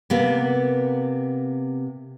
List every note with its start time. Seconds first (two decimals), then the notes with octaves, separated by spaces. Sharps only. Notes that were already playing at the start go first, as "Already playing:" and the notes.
0.10 C3 A#3 B3